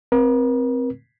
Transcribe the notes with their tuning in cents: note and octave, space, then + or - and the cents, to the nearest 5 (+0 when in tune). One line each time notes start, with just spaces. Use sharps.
C4 +0 A#4 +40